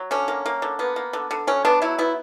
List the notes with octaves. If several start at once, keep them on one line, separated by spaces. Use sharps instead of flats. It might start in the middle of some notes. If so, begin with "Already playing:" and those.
Already playing: F#3
D3 C#4
A#3
A#3
D3
A#3 B3
A#3
D3
D3
F#3 C#4
B3 D4
F#3 E4
B3 E4